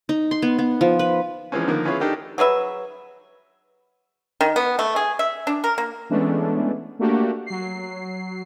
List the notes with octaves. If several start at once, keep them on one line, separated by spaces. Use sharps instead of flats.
D#4
C6
B3
B3
F3
B4
E3 F3 G#3 C4 C#4
D3 D#3 F3 A#3
B3 C#4 E4 F4 G#4 C#5
D4 D#4 G4 A4 A#4
F#3 G#4 B4 E5
D#3
B3
A3
G#4
E5
D4
A#4
A#3
E3 G#3 A3 B3 C#4 D4
A3 A#3 D4 F#4 G4
F#3 C7